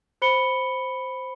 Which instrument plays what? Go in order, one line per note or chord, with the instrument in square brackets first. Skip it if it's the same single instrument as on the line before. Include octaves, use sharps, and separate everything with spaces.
[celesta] C5 B5 C#7 G7